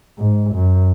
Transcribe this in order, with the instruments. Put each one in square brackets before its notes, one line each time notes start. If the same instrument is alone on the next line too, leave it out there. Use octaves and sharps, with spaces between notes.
[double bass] G#2
F#2